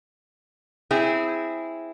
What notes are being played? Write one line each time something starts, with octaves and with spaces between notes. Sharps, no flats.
C4 E4 G#4